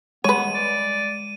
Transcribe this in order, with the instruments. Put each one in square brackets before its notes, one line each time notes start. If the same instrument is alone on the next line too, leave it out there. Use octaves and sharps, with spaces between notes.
[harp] G#3 [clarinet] B3 [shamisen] B4 C#5 [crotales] D#7
[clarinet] D5